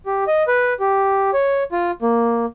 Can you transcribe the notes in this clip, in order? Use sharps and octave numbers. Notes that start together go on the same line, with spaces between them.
G4
D#5
B4
G4
C#5
F4
A#3